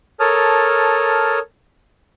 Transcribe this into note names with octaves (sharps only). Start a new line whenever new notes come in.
A4 A#4 C#5 A5 D#6 F6